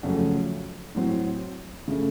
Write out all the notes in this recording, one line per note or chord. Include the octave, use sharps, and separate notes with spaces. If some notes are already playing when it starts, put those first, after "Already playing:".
F2 C#3 F#3 A3
A2 F#3 C4
C#3 A3